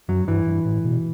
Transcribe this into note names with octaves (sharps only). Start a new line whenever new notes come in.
F#2 F#3
G2 E3
G2
A2
B2